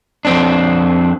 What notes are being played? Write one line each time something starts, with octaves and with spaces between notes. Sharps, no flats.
F2 C4 D4